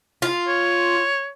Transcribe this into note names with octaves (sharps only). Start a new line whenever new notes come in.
F4
C#5